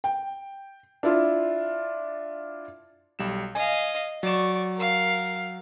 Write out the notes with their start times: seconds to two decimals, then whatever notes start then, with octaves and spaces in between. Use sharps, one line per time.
0.04 G5
1.03 D4 E4 F4
3.19 B1 G3 E7
3.55 D#5 F5 G#5
4.23 F#3 D5 C#6 E7
4.76 A#4 F5